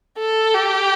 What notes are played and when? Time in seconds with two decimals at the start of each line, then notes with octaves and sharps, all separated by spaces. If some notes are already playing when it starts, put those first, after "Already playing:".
0.18 A4
0.55 G4